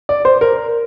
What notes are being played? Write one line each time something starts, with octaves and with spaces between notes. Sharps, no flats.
D5
C5
A#4